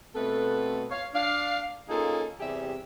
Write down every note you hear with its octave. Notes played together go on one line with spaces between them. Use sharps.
B2 A3 B3 C4 A4 B4
C#5 F5
D4 F5
A#3 C#4 D#4 F4 G#4 A4
E2 C3 G3 G4 G#4 E5